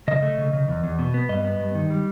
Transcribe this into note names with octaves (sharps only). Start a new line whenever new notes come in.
C#3 D#5
A3
C#3
C#3
E2
E2
B2
B3
G2 D#5
B3
G2
D#3
G3